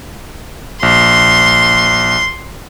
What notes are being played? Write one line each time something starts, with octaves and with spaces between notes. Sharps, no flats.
A#1 C6